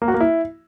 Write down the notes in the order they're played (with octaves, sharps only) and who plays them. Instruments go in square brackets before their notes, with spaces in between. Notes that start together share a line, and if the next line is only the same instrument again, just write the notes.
[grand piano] A#3
F#4
A#3
E4